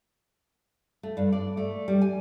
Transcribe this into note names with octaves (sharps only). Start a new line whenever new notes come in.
A3
G2
D5
A3
G3
G#5